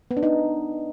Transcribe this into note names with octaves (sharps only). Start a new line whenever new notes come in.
B3
D4
D#4